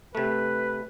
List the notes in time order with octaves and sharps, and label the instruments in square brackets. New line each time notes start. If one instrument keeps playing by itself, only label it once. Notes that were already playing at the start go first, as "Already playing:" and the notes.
[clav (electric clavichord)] C3 A3 [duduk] B4